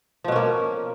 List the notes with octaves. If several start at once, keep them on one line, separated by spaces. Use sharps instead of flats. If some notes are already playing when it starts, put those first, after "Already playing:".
B2 F3 A#3 C#4